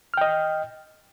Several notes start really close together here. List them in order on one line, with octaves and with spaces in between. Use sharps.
F6 G5 D#5